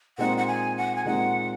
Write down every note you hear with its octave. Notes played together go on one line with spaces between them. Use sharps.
A#2 G#3 C4 D#4 F#5
F#5
G#5
F#5
G#5
A#2 G#3 C4 D#4 F#5